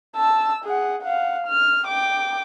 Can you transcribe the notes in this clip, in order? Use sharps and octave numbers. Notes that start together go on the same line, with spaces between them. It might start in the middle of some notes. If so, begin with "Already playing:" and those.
A5 E6
G#4 F#5
F5 F#5
F6
G5 D6